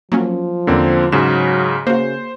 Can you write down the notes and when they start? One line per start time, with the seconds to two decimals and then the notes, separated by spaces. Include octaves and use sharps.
0.12 F3 F#3 A#3 C#4
0.67 E2 D3 A#3 C4 C#4
1.12 G#2 C#3 F#3 E7
1.87 C#3 A#3 F#4 C5